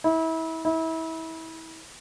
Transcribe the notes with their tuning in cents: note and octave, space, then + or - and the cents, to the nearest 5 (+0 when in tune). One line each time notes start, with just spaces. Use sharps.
E4 -30
E4 -30